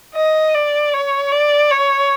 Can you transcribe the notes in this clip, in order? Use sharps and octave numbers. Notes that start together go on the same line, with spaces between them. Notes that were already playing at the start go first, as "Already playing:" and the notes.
D#5
D5
C#5
D5
C#5